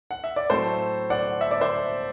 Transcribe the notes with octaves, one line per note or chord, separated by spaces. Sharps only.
F#5
E5
D5
A2 F#3 A3 C4 A4 C5
D5 F#5
E5
D5
C5 E5